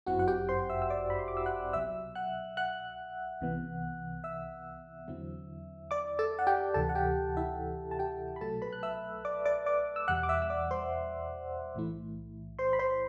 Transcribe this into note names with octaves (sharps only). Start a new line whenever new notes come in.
G1 F#2 F#3 C4 E4 F#4 F#5
F#5
G4 G5
C5 C6
E5 E6
E6
D5 D6
B5
C6
D6
E6
F#5 F#6
C2 B2 F#3 E5 E6
F#5 F#6
F#5 F#6
C2 C3 E3 B3
E5 E6
E2 D3 F#3 C4 E4
D5 D6
A4 A5
F#5
G4 G5
D2 C3 E3 A4 A5
F#5
G4 G5
E4 E5
A5
G4 G5
B5
C2 B2 F#3 A3 A4 A5
B4 B5
F#6
E5 E6
D5 D6
D5 D6
D5 D6
E6
E2 B2 G3 F#5 F#6
D6
E5 E6
E6
D5 D6
C5 C6
B1 A2 E3 A3 E4
C5 C6
B5
C5 C6